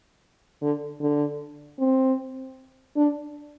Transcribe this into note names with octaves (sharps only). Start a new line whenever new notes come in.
D3
D3
C4
D4